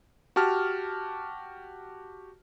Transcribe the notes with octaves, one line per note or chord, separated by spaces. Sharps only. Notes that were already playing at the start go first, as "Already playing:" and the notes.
F#4 G4 A5 F6